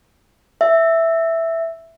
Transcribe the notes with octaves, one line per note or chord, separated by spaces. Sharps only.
E5